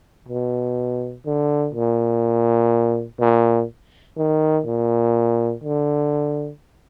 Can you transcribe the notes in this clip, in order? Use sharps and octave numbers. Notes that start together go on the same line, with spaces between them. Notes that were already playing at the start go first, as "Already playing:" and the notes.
B2
D3
A#2
A#2
D#3
A#2
D3